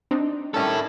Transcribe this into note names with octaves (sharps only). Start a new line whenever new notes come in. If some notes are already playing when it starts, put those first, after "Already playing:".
C4 D4 D#4
D#3 G3 C#4 E4 A4